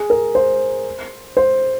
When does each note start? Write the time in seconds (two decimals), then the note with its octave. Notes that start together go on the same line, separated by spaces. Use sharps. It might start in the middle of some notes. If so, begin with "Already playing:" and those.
Already playing: G#4
0.10 A#4
0.35 C5
1.37 C5